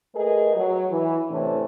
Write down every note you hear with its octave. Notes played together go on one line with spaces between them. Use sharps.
A3 G#4 A#4 B4 D#5
F#3
E3
A2 C3 E3 A3 C#4 D4